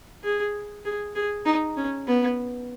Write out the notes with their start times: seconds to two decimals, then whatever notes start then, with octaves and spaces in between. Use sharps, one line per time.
0.24 G#4
0.85 G#4
1.15 G#4
1.46 D#4
1.76 C#4
2.07 B3